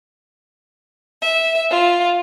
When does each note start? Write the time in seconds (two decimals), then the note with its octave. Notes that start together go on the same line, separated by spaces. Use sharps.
1.21 E5
1.70 F4